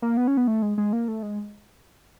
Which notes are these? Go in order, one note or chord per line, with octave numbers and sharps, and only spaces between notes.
A#3
B3
C#4
B3
A3
G#3
G#3
A#3
A3
G#3